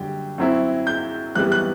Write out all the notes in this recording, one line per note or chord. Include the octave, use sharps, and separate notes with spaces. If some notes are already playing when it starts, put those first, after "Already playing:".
Already playing: F#2 D3 G3 G5
F#2 F#3 C4 E4
G6
F#2 E3 G3 B3 F#6
F#6